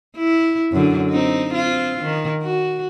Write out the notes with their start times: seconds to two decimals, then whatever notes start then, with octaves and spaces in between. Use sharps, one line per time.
0.16 E4
0.72 F#2 D3
1.10 C4 D#4
1.51 C4 F4
2.04 D#3
2.42 F#4